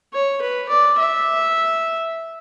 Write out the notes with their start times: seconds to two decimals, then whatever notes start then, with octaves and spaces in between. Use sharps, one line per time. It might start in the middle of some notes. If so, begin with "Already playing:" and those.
0.13 C#5
0.41 B4
0.69 D5
0.98 E5